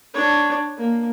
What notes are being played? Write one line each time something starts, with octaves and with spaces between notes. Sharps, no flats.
D4 C#5
A#3